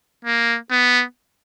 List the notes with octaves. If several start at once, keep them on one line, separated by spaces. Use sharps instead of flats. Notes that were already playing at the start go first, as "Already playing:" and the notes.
A#3
B3